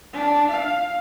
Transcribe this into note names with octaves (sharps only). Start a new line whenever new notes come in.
D4
F5